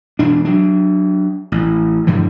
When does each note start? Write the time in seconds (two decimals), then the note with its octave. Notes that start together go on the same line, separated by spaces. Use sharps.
0.19 E1 D4
0.45 F#3 D4
1.52 A1
2.07 G2 D3 E3 F3